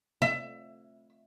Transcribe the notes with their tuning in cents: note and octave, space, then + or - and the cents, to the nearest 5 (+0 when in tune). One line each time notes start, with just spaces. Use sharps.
E5 +20